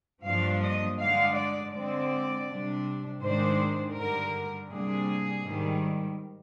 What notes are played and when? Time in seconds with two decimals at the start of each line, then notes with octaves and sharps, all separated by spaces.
0.24 G2 F3 A#3 D4 F5
0.61 D#5
0.99 D3 G#3 D4 F5
1.36 D5
1.73 D3 G#3 C4 D5
2.47 C3 G3 D4
3.21 G#2 D#3 G#3 D4 C5
3.95 G2 D3 G3 A#4
4.70 C3 G3 A#3 D4 G#4
5.44 G#2 D#3 G3